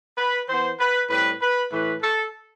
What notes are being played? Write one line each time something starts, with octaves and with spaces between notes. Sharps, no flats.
B4
E3 B3 C5
B4
A2 G3 C4 B4
B4
A2 E3 A3 B4
A4